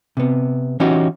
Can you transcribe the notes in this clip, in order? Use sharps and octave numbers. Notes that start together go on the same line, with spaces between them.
C3 B3
E3 C#4 D#4 F#4 G4